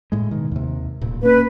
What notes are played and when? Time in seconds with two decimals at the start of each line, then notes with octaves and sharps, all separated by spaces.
0.12 A2 G#3
0.31 B2 D#3
0.51 D#2 C3
1.01 D1 A#2
1.23 A#3 C#4 B4